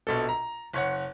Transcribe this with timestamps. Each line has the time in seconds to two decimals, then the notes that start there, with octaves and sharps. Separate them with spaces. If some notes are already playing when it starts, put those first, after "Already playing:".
0.07 A#1 B2 A4
0.29 A#5
0.73 F#1 C#5 F#5